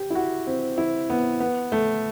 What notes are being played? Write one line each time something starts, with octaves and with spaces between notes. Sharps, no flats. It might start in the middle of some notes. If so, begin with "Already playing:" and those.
Already playing: G4
E4
F#4
C4
E4
B3
B3
A3